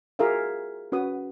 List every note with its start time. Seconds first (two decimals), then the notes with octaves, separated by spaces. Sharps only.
0.19 F4 F#4 G#4 A#4 E5 F5
0.92 C#4 F#4 B4 D#6